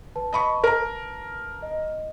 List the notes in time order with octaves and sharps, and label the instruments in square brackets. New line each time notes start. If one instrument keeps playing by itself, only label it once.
[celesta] B4 A5
[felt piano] D#5 B5 C#6
A#4 A#5
[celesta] D#5